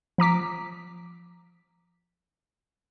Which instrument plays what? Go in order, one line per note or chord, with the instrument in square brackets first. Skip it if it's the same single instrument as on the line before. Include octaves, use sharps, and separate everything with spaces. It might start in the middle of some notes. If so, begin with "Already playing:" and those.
[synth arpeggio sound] F3 A#5 D6 B6